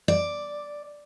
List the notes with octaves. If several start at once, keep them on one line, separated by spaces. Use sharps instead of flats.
D5